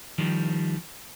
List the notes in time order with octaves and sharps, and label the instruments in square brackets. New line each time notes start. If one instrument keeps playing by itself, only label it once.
[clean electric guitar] D#3 F3 G3